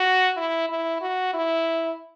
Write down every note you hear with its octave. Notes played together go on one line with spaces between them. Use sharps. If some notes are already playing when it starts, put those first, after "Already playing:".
Already playing: F#4
E4
E4
F#4
E4